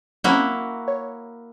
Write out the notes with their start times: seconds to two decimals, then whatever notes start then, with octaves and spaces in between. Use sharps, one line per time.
0.24 F#3 A#3 C4 C#4 E4 F#4
0.88 C#5